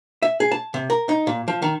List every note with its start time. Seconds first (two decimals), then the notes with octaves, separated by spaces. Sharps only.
0.22 E5
0.40 G#4
0.51 A5
0.74 C3
0.90 A#4
1.09 D#4
1.27 A#2
1.48 F3
1.62 D#3